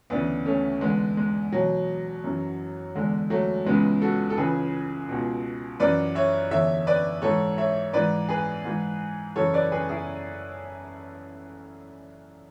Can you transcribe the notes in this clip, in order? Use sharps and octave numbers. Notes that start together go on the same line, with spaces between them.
D2 C#3 E3 B3 D4
A3 C#4
E2 D3 G#3 B3
G#3
E2 B2 F#3
F#2 E3
E2 D3 G#3
F#3 A3
C#2 C#3 E3 G#3 B3
F#4 A4
A4
C#2 C#3 E3 G#4 B4
C#2 B2
F#2 E3 B4 D5
C#5 E5
E2 D3 C#5 E5
B4 D5
G#2 E3 A4 C#5
C#5 E5
G#2 E3 B4 D5
G#4 B4
G#2 E3
F#2 C#3 E3 A4 C#5
B4 D5
G#4 B4
E4 G#4